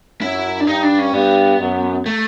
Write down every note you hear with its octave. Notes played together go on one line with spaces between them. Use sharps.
F#2 E4
D4
G2 D#4
D4
C#4
G2 B3
F#2
A3